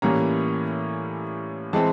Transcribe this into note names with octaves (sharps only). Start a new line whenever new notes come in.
A2 E3 G3 A#3 C#4 A#5
E3 G#3 C4 A5